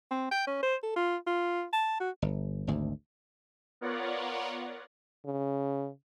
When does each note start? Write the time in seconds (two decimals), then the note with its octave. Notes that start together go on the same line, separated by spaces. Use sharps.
0.11 C4
0.31 G5
0.47 C#4
0.63 C5
0.83 A4
0.96 F4
1.27 F4
1.73 A5
2.00 F#4
2.22 G1
2.67 G#1 D2
3.81 B3 F4 A#4 C#5 D5 F#5
5.25 C#3